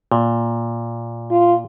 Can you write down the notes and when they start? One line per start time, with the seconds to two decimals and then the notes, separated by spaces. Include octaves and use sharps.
0.12 A#2
1.31 F4